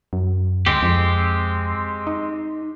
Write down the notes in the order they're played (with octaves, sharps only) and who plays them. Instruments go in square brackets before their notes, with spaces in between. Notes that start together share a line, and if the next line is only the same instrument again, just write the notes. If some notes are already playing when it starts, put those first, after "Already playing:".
[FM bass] F#2
[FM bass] D2 [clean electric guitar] G#3 C4 G4
[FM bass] F2
D#4